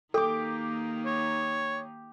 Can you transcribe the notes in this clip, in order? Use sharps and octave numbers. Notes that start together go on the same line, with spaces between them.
D#3 A#3 D#4 G4 A4 D6
C#5